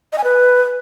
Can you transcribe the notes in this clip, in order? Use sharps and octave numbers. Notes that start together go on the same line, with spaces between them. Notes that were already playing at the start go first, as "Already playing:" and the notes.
D#5
G#5
B4